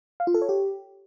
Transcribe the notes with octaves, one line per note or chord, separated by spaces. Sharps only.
F5
F4
A4
C#5
G4